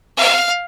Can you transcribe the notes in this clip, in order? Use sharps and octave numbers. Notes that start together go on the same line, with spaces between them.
F5